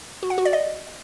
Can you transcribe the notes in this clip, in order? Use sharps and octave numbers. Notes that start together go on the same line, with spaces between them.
F#4
F#5
F#4
D5
D#5